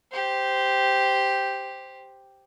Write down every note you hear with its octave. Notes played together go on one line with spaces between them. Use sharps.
G4 C5